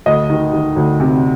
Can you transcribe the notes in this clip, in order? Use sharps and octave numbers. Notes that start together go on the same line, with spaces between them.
D2 D#5
D#3
D#3
D2
C3